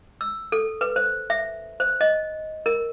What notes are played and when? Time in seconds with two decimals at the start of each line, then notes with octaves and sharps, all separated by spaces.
0.21 E6
0.52 A4
0.81 B4
0.96 C5
1.30 E5
1.80 C5
2.01 D#5
2.66 A#4